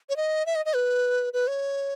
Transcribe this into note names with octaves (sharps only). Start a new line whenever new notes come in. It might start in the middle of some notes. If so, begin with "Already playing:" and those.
C#5
D#5
E5
D#5
D#5
B4
B4
C#5